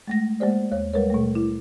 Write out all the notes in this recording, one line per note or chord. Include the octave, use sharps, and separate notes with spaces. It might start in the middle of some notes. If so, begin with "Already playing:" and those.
G#3 A3 A#6
G#3 A#3 G4 C5 D5
D#2 C#5
G3 G#3 A#4 B4 C#5
B2 A3
E4